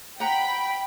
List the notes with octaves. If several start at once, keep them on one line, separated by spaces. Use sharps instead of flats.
F#5 G5 A#5 B5